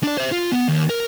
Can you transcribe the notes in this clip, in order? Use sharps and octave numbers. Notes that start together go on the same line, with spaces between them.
D4 D5
C5 E5
F4
B3
D#2
A#4